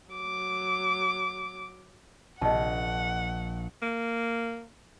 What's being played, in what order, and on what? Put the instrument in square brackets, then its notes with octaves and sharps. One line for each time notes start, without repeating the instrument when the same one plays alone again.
[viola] F#3 D6
[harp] A#1 [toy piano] D#5 A5 [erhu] F#5
[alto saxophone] A#3